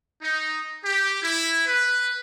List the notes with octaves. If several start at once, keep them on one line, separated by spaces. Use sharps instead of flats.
D#4
G4
E4
B4